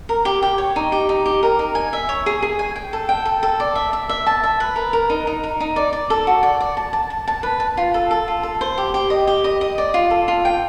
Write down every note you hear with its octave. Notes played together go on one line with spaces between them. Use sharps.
A#4
G4
G4
C#5
D#4
G4
D#4
G4
A#4
D#4
G#5
E5
C#5
G#4
G#4
G#5
G5
A4
G5
A4
A4
D5
E5
E5
E5
A5
E5
B4
A#4
A#4
D#4
D#4
A#4
D#4
D5
D5
A4
F#4
D5
D5
A5
A5
A5
A5
B4
A5
F4
A4
A4
F4
A4
C5
G4
G4
D#5
G4
D#5
D#5
D5
F4
A4
F4
G5